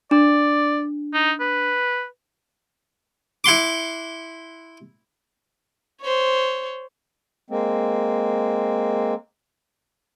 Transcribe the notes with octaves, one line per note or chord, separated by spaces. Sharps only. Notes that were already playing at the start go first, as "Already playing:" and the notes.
D4 D5
D#4
B4
E4 F#5 C6 D6
C5 C#5
G#3 A#3 C4